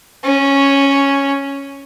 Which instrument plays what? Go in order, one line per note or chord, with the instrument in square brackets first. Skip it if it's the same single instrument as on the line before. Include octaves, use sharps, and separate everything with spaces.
[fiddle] C#4